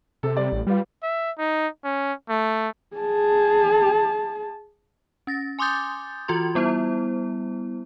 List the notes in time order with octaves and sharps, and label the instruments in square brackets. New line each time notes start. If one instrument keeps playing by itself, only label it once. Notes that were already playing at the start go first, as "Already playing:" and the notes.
[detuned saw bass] C3 [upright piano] A4
[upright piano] G3 D5
[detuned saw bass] A1
[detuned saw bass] G3 [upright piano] F4 B4
[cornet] E5
D#4
C#4
A3
[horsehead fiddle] G#4 A5
[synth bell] C#4 A6 A#6
G#5 C6 D6 D#6 G6 A6
E3 F4 F#4 C6
G3 B3 E4 C5